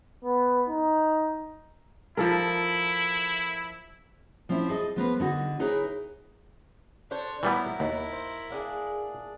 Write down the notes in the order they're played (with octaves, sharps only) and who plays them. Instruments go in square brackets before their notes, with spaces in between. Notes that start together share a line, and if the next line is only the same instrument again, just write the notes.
[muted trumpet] B3
D#4
[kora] F3 A4 A#4 [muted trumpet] E4
[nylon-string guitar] F3 C4 C#4 E4
G#4 A4 D#5
F3 B3 A#4 B4
D3 D#4 F#4
D#4 E4 G#4 A#4 B4 C#5
[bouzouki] D4 A4 C5 [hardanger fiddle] C#5
[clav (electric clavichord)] E3 G3 B3 [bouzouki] F#3 [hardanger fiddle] E4 A#4
[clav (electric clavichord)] D#2 [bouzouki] B2
[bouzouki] C5
A#3 D4 G#4